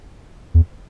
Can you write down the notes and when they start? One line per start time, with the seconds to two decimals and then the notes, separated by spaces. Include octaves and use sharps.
0.54 E2